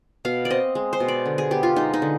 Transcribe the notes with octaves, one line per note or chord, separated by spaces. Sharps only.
B2 F5
D5
C4 D#5
G#3
C5
B2
D5
D3
G#4
B3 G4
F4
G#3 D#4
D#4
D3